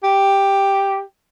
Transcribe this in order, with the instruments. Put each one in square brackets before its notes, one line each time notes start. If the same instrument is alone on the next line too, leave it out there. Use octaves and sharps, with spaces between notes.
[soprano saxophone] G4